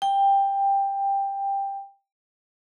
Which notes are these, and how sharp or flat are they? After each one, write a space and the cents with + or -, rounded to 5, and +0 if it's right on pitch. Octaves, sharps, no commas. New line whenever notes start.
G5 +10